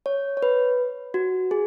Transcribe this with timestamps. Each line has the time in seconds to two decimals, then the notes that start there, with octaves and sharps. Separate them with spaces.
0.06 C#5
0.37 C#5
0.43 B4
1.14 F#4
1.51 G#4